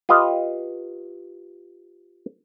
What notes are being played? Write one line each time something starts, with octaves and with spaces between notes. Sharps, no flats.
F4 G4 B4 D#5 F5